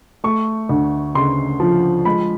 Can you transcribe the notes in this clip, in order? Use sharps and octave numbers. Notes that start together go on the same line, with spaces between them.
A3 C#6
D2
C#3 C6
F3
G#3 B5